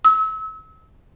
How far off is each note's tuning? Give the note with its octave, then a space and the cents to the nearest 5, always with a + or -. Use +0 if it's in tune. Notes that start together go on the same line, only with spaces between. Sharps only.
E6 -35